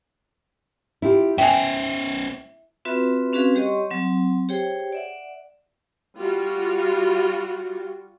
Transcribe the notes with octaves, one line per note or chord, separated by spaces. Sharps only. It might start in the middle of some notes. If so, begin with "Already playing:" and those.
E4 F4 G4
C#4 C5 E5 G5 G#5
C4 F4 F#4 B4 E5 B5
C4 C#4 F#4 G#4 B4 F5
G3 G4 C#5 D#5 C6 C#6
F#3 C4
G4 G#4 C5 C#5 G5
D5 E5 F#5
G3 F4 F#4